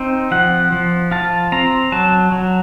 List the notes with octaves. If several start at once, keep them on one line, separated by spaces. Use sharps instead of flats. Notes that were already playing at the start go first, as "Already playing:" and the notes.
Already playing: C4 D#4
F3 F#5
F3
F4 A5
C4 A#5
F#3 A5
F#3